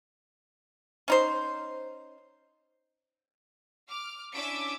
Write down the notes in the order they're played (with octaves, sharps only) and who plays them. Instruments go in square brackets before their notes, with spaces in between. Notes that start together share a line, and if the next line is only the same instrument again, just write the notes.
[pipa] C#4 D#4 C5
[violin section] D6 F6
C#4 D4 E4 D6 E6 D7